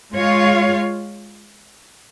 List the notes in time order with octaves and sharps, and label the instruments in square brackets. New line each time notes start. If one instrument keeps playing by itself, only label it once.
[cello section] G#3 F4 C#5 F5